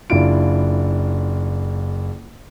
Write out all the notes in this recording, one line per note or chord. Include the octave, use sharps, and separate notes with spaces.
F#1 D4 E4 F4 D7